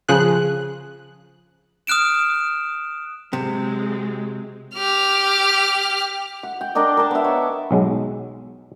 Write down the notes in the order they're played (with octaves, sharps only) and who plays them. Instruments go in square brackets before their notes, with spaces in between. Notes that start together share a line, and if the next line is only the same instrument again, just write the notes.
[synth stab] C#3 F3 G#4 F#6
[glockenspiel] D#6 F6 F#6 D7 E7
[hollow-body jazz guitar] C3 [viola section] F#3 G#3 C4
[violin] G4 F6
[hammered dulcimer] F#5
G5
D4 A#4 D5 D#5
A#4 A5
B3 E5
C#5
[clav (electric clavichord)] B1 F#3 G#3